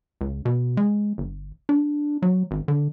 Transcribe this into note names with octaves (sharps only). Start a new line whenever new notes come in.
C#2
B2
G#3
G1
D4
F#3
G#1
D3